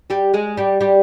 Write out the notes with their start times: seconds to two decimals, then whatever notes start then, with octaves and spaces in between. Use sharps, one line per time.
0.10 G3 G4
0.34 G#3 G#4
0.57 G3 G4
0.80 G3 G4